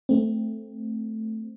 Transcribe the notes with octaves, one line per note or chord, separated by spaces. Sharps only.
A3 C4